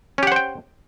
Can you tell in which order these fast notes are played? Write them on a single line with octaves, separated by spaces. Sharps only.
C#4 G4 F#5 C5 G5